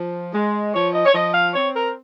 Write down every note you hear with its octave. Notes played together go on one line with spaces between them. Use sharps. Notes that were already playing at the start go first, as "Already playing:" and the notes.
Already playing: F3
G#3
F3 C#5
D#5
C#5
F3 D#5
F5
C4 C#5
A#4